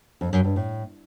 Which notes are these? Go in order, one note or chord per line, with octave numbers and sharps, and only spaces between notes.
F2
F#2
G2
A2